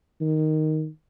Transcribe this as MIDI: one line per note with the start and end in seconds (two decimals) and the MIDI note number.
0.21 0.88 51